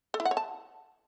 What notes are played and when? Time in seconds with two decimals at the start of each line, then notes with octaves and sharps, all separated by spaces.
0.14 A4
0.20 E4
0.25 F#5
0.31 C#5
0.37 A5